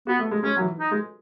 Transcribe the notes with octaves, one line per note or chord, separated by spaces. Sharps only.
B3 F#4
A3
G#3
G#3 C#4
F#3
E3
D#4
G#3